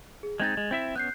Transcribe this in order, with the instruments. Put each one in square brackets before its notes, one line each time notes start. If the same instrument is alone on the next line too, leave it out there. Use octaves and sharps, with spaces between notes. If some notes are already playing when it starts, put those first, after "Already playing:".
[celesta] G#4
[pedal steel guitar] G#3 C4 D#4 [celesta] G#6 A6
[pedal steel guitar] G#3
C4 E4 E5
[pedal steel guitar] B3 C#4 [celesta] F#6 G6 C7